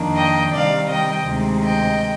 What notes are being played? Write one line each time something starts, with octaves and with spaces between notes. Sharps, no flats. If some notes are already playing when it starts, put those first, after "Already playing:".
Already playing: F2 D#3 A#3 D4
D#5 G5
C3 D#3 G3 D5 F5
D#5 G5
D2 C3 D#3 G#3
D#5 G5